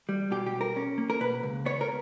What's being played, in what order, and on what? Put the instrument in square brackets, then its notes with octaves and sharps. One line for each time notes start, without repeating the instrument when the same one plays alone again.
[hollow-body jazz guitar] G3
B2 G4
G4
B1
A#4
C#4
A#3
A#4
B2 B4
C#2
B3 C#5
A#4